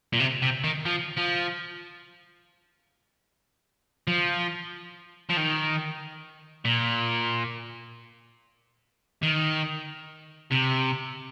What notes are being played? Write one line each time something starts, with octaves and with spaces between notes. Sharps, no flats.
A#2
C3
C3
D#3
F3
F3
F3
F3
D#3
A#2
D#3
C3